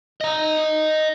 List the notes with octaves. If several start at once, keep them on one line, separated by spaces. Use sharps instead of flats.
D#5 A#5